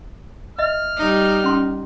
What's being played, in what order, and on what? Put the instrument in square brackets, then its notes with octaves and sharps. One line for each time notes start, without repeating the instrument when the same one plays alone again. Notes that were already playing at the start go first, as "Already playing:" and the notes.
[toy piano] D#5 E5 [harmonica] F6
[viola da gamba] G3 D#4
[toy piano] C#4 C6